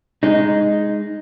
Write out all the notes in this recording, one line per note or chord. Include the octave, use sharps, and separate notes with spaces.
G#3 D#4